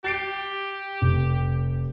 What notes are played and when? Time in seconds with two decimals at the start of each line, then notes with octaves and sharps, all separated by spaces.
0.04 G4 A6 C7 D7
1.02 F1